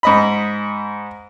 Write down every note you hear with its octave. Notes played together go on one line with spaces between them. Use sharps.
G#2 D#5 B5